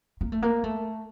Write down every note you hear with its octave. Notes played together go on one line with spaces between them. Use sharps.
A#3
A3
A#3
A3